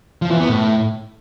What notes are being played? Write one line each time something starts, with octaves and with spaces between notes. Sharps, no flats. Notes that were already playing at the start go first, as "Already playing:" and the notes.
F3
E3
B3
A2